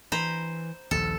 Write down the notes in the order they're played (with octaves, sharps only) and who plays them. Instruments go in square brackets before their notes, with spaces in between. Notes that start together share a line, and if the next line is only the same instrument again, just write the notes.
[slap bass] E3 [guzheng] C5 A#5 B5
[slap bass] A#1 D#2 [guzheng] A4